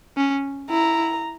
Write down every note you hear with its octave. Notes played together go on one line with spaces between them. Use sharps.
C#4
E4 A#5